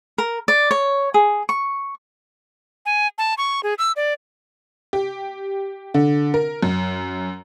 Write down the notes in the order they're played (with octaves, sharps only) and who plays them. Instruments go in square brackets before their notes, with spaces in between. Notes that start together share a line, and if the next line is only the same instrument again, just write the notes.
[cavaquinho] A#4
D5
C#5
G#4
C#6
[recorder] G#5
A5
C#6
G#4
E6
D5
[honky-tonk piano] G4
D3
A#4
F#2